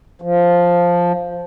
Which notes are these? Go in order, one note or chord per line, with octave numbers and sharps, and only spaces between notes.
F3